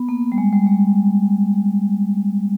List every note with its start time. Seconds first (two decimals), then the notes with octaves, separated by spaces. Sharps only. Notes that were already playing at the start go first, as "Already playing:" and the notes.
Already playing: B3
0.09 A#3
0.32 G3
0.38 G#3
0.53 G3
0.67 G#3